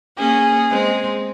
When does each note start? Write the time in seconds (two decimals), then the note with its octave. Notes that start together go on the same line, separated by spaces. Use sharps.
0.18 A#3 C#4 G#4
0.70 G#3 C4